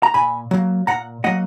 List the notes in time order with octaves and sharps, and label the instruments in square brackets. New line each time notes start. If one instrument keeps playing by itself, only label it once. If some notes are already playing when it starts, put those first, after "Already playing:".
[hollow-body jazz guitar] A#5
A#2 G#5 B5
F#3 A#3
A#2 F#5 A#5
F#3 A#3 D#5 F#5